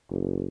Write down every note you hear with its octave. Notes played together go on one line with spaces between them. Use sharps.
F#1